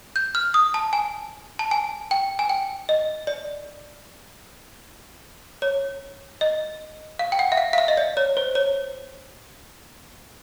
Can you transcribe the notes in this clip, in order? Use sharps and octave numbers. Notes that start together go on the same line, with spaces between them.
G6
F6
D#6
A5
G#5
A5
G#5
G5
G#5
G5
D#5
D5
C#5
D#5
F5
G5
F#5
E5
F5
F5
E5
D#5
D5
C#5
C5
C#5